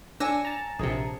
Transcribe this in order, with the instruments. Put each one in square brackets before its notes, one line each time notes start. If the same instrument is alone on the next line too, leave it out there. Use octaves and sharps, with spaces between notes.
[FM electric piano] D4 [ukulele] C#5 G#5 [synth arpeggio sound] E6 A#6
[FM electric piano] A5 A#5
[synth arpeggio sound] A#1 C3 [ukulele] G#4 C#5